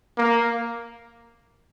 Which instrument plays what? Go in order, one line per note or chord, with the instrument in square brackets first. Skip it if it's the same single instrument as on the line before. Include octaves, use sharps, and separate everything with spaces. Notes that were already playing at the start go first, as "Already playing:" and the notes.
[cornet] A#3